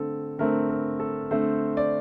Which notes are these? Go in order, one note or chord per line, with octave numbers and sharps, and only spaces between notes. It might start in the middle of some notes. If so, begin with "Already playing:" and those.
Already playing: D3 A3 C4 A4
D3 A3 C4 A#4
A#4
A4
D3 A3 C4 C5
D5